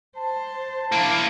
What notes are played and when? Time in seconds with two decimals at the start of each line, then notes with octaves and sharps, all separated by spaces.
0.18 C5 A5
0.92 A#3 D4 E4